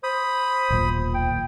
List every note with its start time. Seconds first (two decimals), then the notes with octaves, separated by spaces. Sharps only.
0.04 C5 B5 D#6
0.70 D#1 B1 A#2
1.14 G5